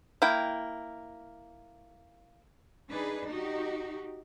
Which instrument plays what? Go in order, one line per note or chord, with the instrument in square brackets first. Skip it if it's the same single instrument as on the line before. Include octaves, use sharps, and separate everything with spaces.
[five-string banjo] A#3 E4 G5
[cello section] D4 D#4 G#4 B4
D#4 F#4 G4